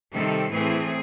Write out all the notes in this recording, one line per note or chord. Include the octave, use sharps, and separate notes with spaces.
C3 D#3 G3 C4 A4
A2 E3 A3 C4 G#4